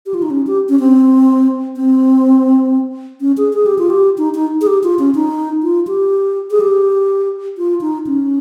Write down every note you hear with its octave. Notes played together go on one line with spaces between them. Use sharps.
G4
F4
D#4
C#4
G4
C#4
C4
C4
C#4
G#4
G#4
G4
F4
G4
D#4
D#4
G#4
G4
F4
C#4
D#4
F4
G4
G#4
G4
F4
D#4
C#4